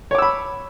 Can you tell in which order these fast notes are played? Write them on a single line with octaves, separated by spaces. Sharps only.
C#5 D6 E6 B5